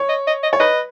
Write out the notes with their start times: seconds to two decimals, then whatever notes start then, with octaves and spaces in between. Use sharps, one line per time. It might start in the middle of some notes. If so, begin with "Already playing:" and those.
Already playing: C#5
0.09 D#5
0.27 D#5
0.43 D#5
0.53 C#5
0.60 B4 D#5